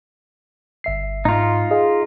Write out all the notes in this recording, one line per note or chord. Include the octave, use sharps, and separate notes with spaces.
G1 E5 C7
G#2 D#4 F4
G#4 D#5 F5